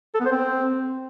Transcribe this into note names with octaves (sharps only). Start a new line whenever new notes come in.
A4
B3
C5
C4